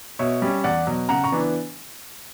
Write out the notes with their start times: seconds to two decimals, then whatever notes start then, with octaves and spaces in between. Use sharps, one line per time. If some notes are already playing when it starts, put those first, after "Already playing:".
0.19 B2 C#5 E5
0.42 G3 C#4
0.64 E2 D5 F#5
0.87 B2 F#3
1.09 C#3 F#5 A#5
1.24 A#5 C#6
1.32 E3 B3 D4